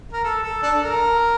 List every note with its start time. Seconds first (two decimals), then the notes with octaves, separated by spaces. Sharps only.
0.13 A#4
0.24 A4
0.43 A4
0.63 D4 A4
0.82 A#4